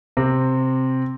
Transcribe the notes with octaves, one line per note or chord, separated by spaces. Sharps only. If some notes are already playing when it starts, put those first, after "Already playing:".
C3 C4